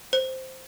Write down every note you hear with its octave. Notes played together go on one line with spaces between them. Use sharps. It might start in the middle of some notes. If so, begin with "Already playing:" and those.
C5